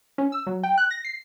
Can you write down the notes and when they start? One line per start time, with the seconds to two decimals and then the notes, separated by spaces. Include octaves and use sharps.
0.18 C#4
0.32 E6
0.47 F#3
0.63 G5
0.78 F#6
0.91 A#6
1.05 C7